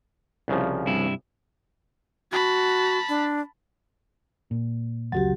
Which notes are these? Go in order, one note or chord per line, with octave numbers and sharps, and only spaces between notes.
C2 C#3 F3
G2 C3 E4
F#4 A5 B5
D4
A#2
F1 C#2 F#3 F#4 G4